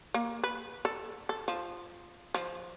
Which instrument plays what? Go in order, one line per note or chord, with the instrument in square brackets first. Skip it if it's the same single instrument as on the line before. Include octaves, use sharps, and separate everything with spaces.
[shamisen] A#3
B4
A4
A4
F3
F3